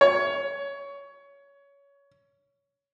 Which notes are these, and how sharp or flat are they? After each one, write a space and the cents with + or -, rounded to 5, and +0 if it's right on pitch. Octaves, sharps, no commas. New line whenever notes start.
C#5 +20